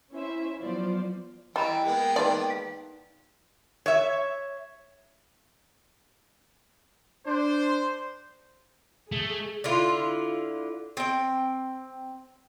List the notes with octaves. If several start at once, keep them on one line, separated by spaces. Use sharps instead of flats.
C#4 E4 C5 E5
F3 F#3 B3 F4 C5 D5
E3 G3 D#5 G5 A#5 B5
G#3 A#3 B3
D#4 B4 D5 A5 C6
F5
C#5 E5
D4 C5
A3 G#4
D3 E4 F4
C4 G5